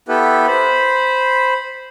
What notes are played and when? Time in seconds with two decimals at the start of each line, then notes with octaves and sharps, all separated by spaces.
0.08 B3 E4 G4 A4 B4
0.47 C5 B5